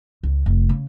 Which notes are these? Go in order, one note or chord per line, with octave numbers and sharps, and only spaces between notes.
C#2
F1
C#3 C#4